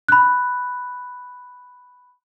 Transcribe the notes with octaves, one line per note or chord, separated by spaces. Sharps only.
B5 F#6